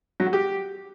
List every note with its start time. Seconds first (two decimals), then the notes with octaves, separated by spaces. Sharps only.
0.20 F#3
0.26 F#4
0.33 G4